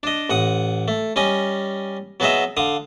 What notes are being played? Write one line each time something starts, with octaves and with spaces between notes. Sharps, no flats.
D4 D#5
A1 F#5 D#6
A3
G3 C#4 D#5 G#5
F#3 B3 F#4 G#4 D#5 E5
D3 F5 D#6